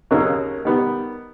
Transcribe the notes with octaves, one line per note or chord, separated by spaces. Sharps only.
D#2 C#3 F#3 A#3 D#4
D#3 G3 B3